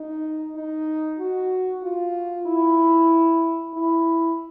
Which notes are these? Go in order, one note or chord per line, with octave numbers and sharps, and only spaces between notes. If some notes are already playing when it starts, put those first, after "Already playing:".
Already playing: D#4
D#4
F#4
F4
E4
E4